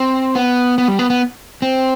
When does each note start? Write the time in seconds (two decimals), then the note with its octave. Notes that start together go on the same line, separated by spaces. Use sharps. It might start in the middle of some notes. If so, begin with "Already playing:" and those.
Already playing: C4
0.35 B3
0.78 B3
0.88 G3
0.99 B3
1.10 B3
1.62 C4